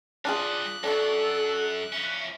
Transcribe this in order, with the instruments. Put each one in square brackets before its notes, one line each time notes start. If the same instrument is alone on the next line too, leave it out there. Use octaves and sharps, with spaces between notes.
[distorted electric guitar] G3 G#5 [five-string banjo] D4 F4 G#4 [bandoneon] F#6
[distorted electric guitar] F#2 [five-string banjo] D4 F#4 [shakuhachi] A4
[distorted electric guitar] F3 C#4 [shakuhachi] E5